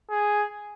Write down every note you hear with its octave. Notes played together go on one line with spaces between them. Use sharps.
G#4